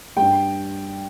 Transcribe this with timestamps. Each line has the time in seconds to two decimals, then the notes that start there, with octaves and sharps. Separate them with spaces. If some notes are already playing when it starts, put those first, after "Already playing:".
0.17 G2 G3 G5